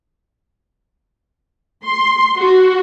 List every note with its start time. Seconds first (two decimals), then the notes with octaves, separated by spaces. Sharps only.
1.84 C6
2.37 F#4